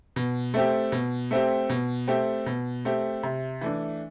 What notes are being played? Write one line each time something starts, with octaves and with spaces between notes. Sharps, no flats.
B2
A3 C4 G4
B2
A3 C4 G4
B2
A3 C4 G4
B2
A3 C4 G4
C3
E3 A3 D4